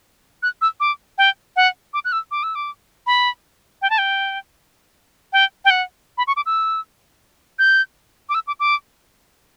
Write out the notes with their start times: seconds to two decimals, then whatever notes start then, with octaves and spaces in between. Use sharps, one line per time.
0.43 F#6
0.61 E6
0.80 D6
1.18 G5
1.56 F#5
1.94 D6
2.05 F#6
2.12 E6
2.31 D6
2.43 E6
2.55 D6
3.07 B5
3.82 G5
3.90 A5
3.98 G5
5.33 G5
5.65 G5
5.70 F#5
6.18 B5
6.27 C#6
6.36 D6
6.46 E6
7.59 G6
8.29 D6
8.34 E6
8.47 D6
8.60 D6